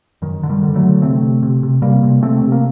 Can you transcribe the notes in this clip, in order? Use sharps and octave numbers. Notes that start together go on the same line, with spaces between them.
F#2 D#3
D3
D#3 G3
D3
F#3 A3
D3
C3 A3 C4
C3
C3
C3
C3 G3 A#3
C3
C3 A3 C4
C3
A#3